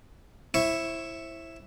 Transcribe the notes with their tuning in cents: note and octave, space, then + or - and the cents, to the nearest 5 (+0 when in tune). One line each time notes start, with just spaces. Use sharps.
E4 +0 C5 +40 C#6 +0